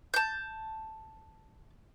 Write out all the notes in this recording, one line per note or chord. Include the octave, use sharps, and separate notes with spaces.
A5 G6